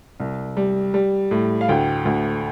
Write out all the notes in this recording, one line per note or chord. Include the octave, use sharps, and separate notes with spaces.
C2
G3
G3
A2
F5
D2 G5
D2